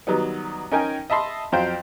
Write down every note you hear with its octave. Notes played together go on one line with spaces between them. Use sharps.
D#3 F#3 G3 B3
C#4 D#4 A#4 G5 G#5
D#5 E5 A5 B5 C6
F2 F#3 C5 F5 G5